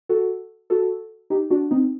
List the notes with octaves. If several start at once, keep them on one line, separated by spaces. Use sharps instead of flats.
F#4 A4
F#4 A4
D#4 G4
D4 F#4
C4 D#4